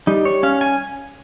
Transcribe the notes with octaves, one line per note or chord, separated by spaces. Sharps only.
G3 D#4
C#5
C#4 F5
G#5